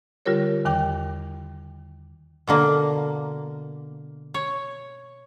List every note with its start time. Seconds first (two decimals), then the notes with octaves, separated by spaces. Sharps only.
0.26 D3 G3 F4 G4 A#4 C#5
0.65 E2 D#3 G5 D6
2.47 B2 D3 A#3
4.34 C#5